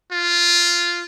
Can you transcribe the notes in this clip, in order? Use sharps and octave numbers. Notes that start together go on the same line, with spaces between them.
F4